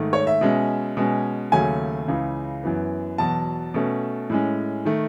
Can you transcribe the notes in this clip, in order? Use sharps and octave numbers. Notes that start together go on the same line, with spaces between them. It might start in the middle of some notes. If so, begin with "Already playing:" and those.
Already playing: G#2 D#3 A3
C#5
E5
B2 G#3 C#4
B2 G#3 C#4
D#2 C#3 F#3 A3 C#4 G#5
C#2 C#3 E3
F#2 E3 B3
E2 B2 F#3 A5
B2 A3 C#4
A2 G#3 C#4
D#3 A3